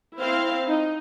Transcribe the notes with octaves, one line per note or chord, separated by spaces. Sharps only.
C4 E4 C5 F5
D#4